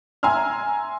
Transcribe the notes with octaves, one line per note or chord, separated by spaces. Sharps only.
E5 G#5 A#5 C6 E6 F6